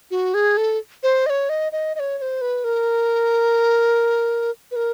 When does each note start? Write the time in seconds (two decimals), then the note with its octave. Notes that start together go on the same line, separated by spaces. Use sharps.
0.11 F#4
0.34 G#4
0.57 A4
1.03 C5
1.26 D#5
1.30 C#5
1.49 D#5
1.72 D#5
1.95 D#5
2.00 C#5
2.18 C#5
2.22 C5
2.41 B4
2.64 A#4
4.71 B4
4.76 A#4